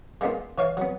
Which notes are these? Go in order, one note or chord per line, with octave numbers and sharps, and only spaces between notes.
G#3 A#3 B3 D4 F4
E3 C#5 F5
F#3 B3